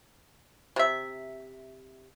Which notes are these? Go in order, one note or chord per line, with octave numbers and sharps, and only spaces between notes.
C3 E5